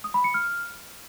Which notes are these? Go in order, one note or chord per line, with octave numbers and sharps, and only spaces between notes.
D#6
B5
C#7
F6